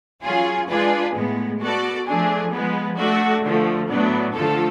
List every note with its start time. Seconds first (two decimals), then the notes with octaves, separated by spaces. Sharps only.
0.23 F#3 C#4 F4 G#4
0.68 G#3 D4 F4 G#4 B4
1.14 A2 G#3 B3
1.60 B3 F#4 A4 D5
2.06 F3 A3 D4 G#4
2.52 F3 G#3 B3
2.97 A3 D4 F#4
3.43 D3 F3 A3
3.89 A2 F#3 B3 D4
4.34 D3 F3 A3 F4 A4